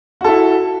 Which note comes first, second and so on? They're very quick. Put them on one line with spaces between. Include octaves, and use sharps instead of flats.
F#4 A4 E4